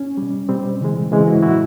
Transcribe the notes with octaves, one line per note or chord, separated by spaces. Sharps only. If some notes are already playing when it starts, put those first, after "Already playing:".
Already playing: C#4
B2 G3
B2 G3 C4
C#3 E3 G#3
C#3 E3 G#3 C4
E4 F#4
A2 F#3 E4 F#4